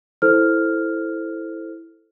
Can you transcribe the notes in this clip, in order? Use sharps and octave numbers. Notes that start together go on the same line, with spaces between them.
E4 A4 C5 F6